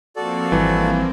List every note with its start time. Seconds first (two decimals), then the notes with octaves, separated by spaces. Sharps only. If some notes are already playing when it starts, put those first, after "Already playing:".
0.16 F3 A#3 C4 F#4 A4 D5
0.52 G#1 E3 G3